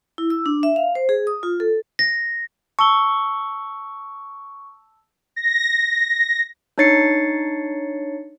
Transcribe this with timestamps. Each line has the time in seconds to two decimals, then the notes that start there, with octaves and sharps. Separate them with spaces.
0.18 E4
0.30 E6
0.46 D4
0.63 E5
0.76 F5
0.95 C5
1.09 G#4
1.27 D#6
1.43 F4
1.60 A4
1.99 A#6
2.79 A5 C#6 E6 G7
5.36 A#6
6.78 D4 D#4 C#5 A6 C7 C#7